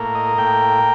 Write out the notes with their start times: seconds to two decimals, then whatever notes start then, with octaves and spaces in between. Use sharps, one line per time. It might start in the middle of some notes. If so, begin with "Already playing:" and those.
Already playing: A2 A#3
0.15 D#5
0.38 A2 G5